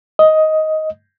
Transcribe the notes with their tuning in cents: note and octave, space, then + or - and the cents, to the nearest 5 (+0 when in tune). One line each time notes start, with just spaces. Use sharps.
D#5 +10